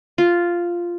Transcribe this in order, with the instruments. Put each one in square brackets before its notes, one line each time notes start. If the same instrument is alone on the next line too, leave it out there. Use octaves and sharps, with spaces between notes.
[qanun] F4